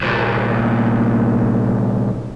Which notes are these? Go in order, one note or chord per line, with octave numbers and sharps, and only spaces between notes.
C2 A#2